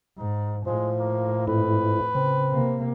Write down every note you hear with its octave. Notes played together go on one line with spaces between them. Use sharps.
G#2 D#4
A2 F3 G#3
A#3
F2 G#2 E4 B4
C#3 C4
C3 A#3